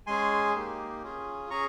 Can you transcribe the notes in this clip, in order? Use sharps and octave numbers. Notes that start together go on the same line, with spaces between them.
G#3 C#4 G#4 G#5 C6
A#3 D#4 G4
C#4 F4 G#4
C#4 G#4 A#5 C#6